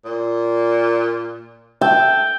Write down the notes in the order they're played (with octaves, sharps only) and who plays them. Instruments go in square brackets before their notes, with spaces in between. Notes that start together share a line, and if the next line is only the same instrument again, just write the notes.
[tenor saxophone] A#2
[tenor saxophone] A4 [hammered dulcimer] G5